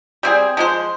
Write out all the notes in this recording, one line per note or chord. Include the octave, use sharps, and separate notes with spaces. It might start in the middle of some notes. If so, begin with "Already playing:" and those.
G3 C4 G#4
F3 G#3 C5